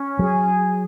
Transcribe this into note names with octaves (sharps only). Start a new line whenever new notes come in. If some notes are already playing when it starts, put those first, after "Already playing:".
Already playing: C#4
F#3 G#4